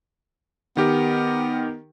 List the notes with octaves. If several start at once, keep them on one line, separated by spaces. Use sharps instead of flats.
D#3 B3 G4 A#4